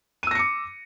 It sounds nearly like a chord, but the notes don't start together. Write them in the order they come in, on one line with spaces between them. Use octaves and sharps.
D#7 E6 A#6 C#7 D6